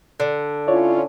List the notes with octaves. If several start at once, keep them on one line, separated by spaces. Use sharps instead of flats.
D3
C#4 E4 F4 C#5 D5